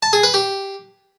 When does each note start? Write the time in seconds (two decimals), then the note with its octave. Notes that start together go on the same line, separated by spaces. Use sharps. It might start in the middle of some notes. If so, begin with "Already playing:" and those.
0.03 A5
0.13 G#4
0.23 B4
0.34 G4